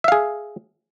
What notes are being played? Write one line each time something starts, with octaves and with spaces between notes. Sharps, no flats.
G#4 E5 F5